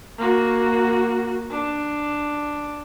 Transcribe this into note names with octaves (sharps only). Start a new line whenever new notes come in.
A#3 F#4
D4